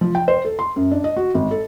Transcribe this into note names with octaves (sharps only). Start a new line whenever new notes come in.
F3
G5
C5
A4
C6
F#2
D4
D#5
F#4
G#1
A4